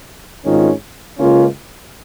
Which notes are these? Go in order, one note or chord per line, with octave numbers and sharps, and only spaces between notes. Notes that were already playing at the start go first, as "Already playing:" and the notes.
G#1 G#2 D#3 C#4 F4
C#2 C#3 A#3 C#4 F4